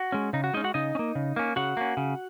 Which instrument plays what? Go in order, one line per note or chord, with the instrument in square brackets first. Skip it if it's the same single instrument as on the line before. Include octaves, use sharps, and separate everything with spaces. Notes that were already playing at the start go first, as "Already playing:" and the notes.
Already playing: [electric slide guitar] F#4
G#3 C#4
C#3 D#4
F#4
G#3 C#4 D#4 D#5
F#4 F#5
C#3 D#4 D#5
C#4
A#3
C#3
A#3 C#4
C#3 F#4 F#5
A#3 C#4
C#3